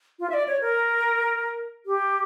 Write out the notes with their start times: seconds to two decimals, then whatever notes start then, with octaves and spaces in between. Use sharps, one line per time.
0.19 F4
0.30 E5
0.34 D5
0.48 C#5
0.61 A#4
1.86 G4